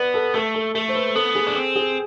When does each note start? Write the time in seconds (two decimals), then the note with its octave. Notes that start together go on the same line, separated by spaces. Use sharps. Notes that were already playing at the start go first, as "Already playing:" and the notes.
Already playing: B3 B4 D5
0.14 A4
0.34 A3 A4
0.55 A4
0.75 A3 A4
0.88 C5
0.95 B4
1.15 B3 A4
1.35 G#4
1.47 D4
1.55 C4
1.76 G#4